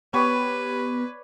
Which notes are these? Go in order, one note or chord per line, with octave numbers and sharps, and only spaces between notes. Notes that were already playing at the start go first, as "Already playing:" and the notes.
B3 G4 B4 C#5 D5 B5